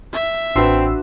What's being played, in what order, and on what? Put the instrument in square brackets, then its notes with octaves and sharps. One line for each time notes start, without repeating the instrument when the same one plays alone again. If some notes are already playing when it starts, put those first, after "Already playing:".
[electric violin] E5
[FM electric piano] A1 C6 E6 [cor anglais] C4 [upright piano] D4 F#4 B4